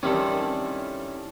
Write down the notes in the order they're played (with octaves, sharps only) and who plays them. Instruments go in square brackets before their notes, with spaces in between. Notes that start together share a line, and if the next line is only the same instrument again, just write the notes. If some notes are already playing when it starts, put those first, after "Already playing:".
[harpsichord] D#3 G3 C4 [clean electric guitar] C#4 E4 A4